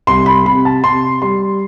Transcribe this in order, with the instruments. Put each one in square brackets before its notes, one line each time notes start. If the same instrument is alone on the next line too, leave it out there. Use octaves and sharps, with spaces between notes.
[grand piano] C2 C6
B5
C3 B5
A5
C3 C6
G3 C6